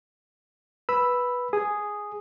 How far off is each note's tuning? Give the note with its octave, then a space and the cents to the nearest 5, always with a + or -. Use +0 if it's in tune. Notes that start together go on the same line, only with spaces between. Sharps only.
B4 -10 B5 +0 E6 +0
G#4 +0 D#6 -5